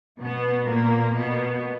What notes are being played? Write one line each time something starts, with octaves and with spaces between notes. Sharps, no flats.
B2 B3
A#2 A#3
B2 B3